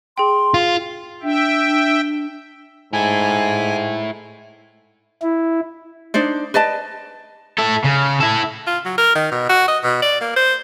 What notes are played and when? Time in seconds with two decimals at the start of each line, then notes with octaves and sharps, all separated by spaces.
0.18 G#4 G5 C6
0.54 F4
1.23 D4 E5 G5
2.93 G#2 E4 A4 G#5
5.22 E4
6.14 D4 D#4 C5 D5
6.54 B4 D5 D#5 A5
7.59 E4 A4
7.85 C#3
8.21 E4 A4
8.67 F4
8.85 F#3
8.98 A#4
9.15 D#3
9.32 B2
9.49 F#4
9.68 D#5
9.83 B2
10.02 D5
10.21 A#3
10.36 C5